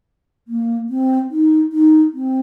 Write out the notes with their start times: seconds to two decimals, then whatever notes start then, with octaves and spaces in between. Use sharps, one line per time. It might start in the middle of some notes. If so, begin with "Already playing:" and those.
0.48 A#3
0.90 C4
1.31 D#4
1.73 D#4
2.14 C4